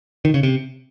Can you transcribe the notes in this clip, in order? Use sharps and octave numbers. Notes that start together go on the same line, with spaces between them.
D#3
C#3
C3